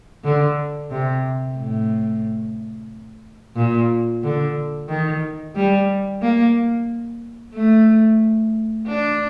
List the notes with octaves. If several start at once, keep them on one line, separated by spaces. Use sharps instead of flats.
D3
C3
A2
A#2
D3
D#3
G3
A#3
A3
D4